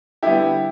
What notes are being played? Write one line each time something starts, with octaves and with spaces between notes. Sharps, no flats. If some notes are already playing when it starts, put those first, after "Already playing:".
D3 G3 B3 E4 G4